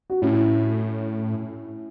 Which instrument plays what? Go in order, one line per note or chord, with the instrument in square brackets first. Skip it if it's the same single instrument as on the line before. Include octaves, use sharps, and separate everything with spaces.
[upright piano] F#4
[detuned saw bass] A2 [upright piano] C#4 E4